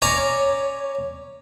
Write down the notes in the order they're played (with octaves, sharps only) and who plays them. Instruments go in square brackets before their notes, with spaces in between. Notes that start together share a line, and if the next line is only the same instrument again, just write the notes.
[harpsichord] C#4 D5 A#5 [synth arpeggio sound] C#5